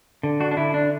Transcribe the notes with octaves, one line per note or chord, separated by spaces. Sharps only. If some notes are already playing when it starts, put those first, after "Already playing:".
D3
D4 F#4
D4
D3 E4
D4